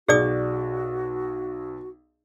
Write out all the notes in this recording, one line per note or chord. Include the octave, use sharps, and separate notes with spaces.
B1 F#4 G#4 D5 D#6